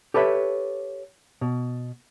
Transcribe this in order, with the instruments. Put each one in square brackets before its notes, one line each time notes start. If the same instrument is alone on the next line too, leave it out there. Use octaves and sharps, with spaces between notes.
[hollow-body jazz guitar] G4 A4 B4 C#5 E5
B2